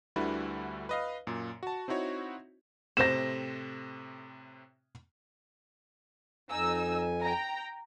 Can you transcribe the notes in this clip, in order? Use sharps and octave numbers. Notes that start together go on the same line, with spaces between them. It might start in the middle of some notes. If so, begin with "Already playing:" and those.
D2 D3 G3 E4 F#4 B4
B4 D#5 F5
F#2 A#2
F#4 A5
C4 D#4 E4 F#4 C#5
A2 C3 C4 A4 C5 A#6 E7
F2 D#4 G#5 E6
G5 A#5